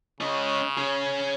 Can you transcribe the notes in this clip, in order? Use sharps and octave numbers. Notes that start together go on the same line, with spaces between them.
C#3 C#4 D#5
C#4 G#4